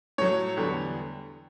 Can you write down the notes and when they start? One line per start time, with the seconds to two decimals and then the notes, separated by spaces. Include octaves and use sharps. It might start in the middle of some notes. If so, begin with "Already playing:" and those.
0.18 A2 F#3 C#5
0.57 E2 D3 G3